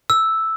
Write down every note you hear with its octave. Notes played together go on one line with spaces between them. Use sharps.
E6